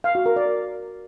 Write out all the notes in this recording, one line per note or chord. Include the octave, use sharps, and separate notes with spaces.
F5
F#4
A#4
D5